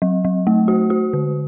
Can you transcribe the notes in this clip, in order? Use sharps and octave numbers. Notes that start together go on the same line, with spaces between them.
F#3
F#3
A3
F#4
F#4
D3